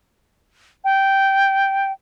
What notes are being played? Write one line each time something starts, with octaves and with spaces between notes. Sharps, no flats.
G5